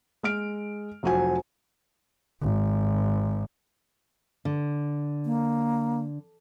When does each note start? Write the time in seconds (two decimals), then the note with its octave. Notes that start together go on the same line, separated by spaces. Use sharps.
0.23 G#3 F6 D7
1.03 F1 F3 F#3 F#4 C5 G#5
2.42 G#1
4.45 D3
5.25 A#3